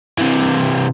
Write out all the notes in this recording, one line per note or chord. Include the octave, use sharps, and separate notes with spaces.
C3 E3